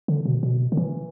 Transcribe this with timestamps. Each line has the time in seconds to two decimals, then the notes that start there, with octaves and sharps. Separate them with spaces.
0.08 D3
0.25 B2
0.43 B2
0.72 D3
0.77 E3